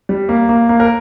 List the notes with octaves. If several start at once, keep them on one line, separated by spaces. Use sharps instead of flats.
G3
A#3
A#3
A#3
A#4